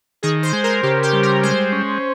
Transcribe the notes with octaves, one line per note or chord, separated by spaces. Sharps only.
D#3 G#4
C5
G#3
A#4
C#3 G4
G4
G3
A#4
G#3 C5
C#4